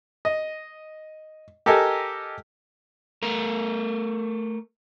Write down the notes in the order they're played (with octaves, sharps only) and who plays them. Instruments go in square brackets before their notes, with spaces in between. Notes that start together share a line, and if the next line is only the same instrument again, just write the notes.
[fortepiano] D#5
G4 A4 A#4 D#5 G#5
[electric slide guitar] A3 A#4